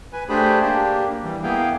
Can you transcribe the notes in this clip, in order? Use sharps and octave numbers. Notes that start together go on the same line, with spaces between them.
B4 G#5
A3 D4 G4 G#4 C5 B5
A#3 D4 G4
E3 G3
A#3 B3 E4 G#4 F5 G5